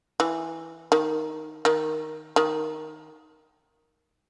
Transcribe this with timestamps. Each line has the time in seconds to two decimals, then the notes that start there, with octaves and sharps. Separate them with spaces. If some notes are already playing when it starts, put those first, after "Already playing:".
0.20 E3
0.92 D#3
1.65 D#3
2.36 D#3